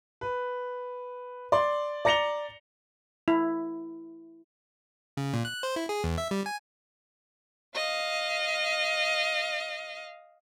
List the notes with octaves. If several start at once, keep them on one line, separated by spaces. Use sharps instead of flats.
B4
D5 C6
D5 A#5 A#6 C#7 F7 G7
E4
C#3
A#2
F#6
C5
E4
G#4
E2
E5
G3
G#5
D#5 F5